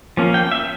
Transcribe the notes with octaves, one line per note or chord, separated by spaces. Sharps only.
F3 A#3 C#4
G5
E5